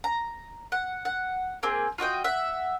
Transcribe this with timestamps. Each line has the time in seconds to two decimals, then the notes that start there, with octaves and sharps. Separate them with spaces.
0.04 A#5
0.72 F#5
1.05 F#5
1.63 A#3 C4 G#4
1.98 F4 F#4 D#5 G5
2.24 E5 F#5